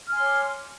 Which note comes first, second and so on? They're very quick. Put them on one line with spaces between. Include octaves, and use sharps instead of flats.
F6 G#5 C6 C#5 D6